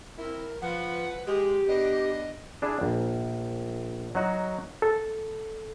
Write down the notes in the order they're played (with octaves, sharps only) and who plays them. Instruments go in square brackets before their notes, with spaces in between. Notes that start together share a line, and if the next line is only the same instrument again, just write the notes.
[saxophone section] C4 E4 [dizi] A#4
[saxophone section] F3 [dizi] B4 [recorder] F#5
[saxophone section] G#3 [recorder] G4
[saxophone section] B3 D4 [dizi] D#5
[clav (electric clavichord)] D4 E4 G#4
A#1
F#3 D#4 F#4
[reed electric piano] A4